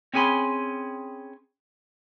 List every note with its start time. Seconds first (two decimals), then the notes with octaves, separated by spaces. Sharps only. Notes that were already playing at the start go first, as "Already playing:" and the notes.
0.14 C4 C#4 G#4 G#5 B5 C6